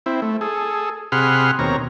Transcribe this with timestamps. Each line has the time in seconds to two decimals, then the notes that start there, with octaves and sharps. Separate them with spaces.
0.06 C4 E4
0.22 A3
0.41 G#4 A4
1.12 C3 G#4 F#5 B5 C6 F6
1.59 D#2 B2 C4 C#5 A#5